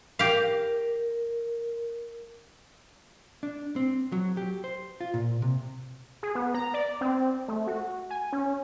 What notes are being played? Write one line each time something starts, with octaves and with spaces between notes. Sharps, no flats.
G4 A#4 F5
D4
C4
F#3
G4
C5
F4
A#2
C3
G#4
B3
A#5
D5
C4
A3
F#4
G#5
C#4